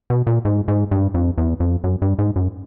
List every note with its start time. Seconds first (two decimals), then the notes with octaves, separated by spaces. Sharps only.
0.10 B2
0.27 A#2
0.45 G#2
0.68 G#2
0.91 G2
1.14 F2
1.38 E2
1.60 F2
1.84 F#2
2.02 G2
2.19 G#2
2.36 F#2